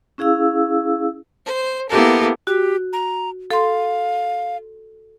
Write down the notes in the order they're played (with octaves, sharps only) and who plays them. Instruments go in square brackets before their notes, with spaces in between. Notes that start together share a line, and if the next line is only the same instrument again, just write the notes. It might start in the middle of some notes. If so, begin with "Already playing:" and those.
[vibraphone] C#4 E4 G#4 F5 E6
[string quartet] C5
A#3 B3 E4 G4 A4 A#4
[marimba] F#4 [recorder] G4
[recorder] A#5
[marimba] A4 C6 [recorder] F5